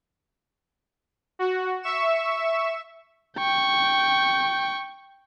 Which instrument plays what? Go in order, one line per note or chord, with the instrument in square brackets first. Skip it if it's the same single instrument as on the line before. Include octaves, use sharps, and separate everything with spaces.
[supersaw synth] F#4
E5 C#6 E7
[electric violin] G5 C#6